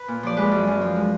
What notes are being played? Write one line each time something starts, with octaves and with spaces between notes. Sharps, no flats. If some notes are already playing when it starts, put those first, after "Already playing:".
Already playing: B4
A#2
F3 D5
G#3 B4
F#2
F#2
F3
G#3